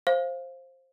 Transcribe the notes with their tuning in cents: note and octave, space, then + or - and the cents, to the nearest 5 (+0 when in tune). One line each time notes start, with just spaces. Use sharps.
C5 +15 F5 -5